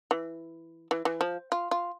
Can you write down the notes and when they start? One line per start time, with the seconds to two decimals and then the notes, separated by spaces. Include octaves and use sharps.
0.11 E3
0.91 E3
1.05 E3
1.21 F3
1.52 F4
1.71 F4